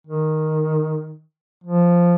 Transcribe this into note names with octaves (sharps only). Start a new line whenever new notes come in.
D#3
F3